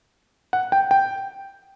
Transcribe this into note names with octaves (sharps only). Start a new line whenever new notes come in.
F#5
G5
G5